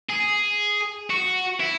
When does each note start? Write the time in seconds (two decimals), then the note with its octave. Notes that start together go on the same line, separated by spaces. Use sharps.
0.10 G#4
1.10 F#4
1.60 E4